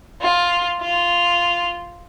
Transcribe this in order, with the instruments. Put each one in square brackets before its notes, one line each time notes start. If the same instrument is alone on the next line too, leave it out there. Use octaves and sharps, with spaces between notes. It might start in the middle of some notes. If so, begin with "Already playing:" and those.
[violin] F4
F4